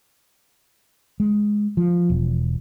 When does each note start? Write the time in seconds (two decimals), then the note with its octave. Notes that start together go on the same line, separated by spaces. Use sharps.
1.20 G#3
1.77 F3
2.10 E1